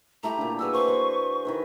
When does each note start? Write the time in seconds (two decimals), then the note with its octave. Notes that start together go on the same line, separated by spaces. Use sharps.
0.23 A3 E4 G4 A#5
0.38 A#2 D3
0.59 F#4 G#4 B4 E6
0.73 A#3 B4 C5 C#6
0.88 G#4 B4 C5
1.45 D#3 E4 B4